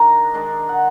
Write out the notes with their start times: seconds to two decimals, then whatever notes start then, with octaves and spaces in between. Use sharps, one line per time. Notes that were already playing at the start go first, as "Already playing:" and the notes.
Already playing: D#3 G#3 D4 A#5
0.34 D#3 G#3 D4
0.69 F#5